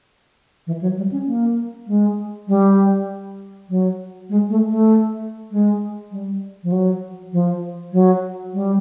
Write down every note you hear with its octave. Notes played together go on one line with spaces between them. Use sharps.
E3
F#3
G3
C#4
A#3
G#3
G3
F#3
G#3
A3
A3
G#3
G3
F3
F#3
F3
F#3
G3